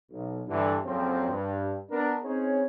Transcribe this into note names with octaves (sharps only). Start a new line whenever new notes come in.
B1
G2 D3 E3
F2 A#2 C#3 F3 F#3 C4
G2
B3 D4 A#4
C4 C#4 D#4 G#4 C5 C#5